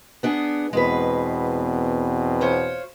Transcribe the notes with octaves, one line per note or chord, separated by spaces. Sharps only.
B3 D4 G#4
E2 B2 G#3 C4 B4
F4 C5 C#5